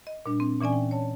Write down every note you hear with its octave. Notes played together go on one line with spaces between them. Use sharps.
D#5
A#2 G3 D4
C4
A#2 E3 C#4 D5 G#5
G5
C#5 A5